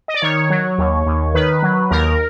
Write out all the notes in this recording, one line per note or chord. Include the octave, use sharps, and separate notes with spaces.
D#5
D5
D#3 C#5
F#3
D#2
D#2
D#3 B4
F#3
D#2 A#4